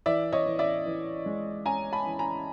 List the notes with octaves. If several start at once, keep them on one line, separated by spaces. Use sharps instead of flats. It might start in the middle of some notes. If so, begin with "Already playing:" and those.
E3 D5 E5
C#5 D#5
E3
D5 E5
E3
G#3
C#4 G#5 A#5
A5 B5
E3
G#5 A#5